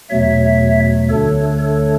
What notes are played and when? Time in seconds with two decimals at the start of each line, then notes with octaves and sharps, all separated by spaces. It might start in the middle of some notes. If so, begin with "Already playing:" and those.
0.10 E2 B2 F#3 A3 C#5 E5
1.09 D2 D3 A3 D4 A4 C#5
1.59 A4 C#5